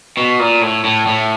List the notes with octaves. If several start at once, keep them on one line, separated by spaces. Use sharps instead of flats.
B2
A#2
A2
A2
A2